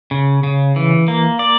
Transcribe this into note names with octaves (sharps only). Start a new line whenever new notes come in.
C#3
C#3
E3
A#3
D5